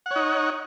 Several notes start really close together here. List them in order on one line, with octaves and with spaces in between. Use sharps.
F#5 C#5 D#4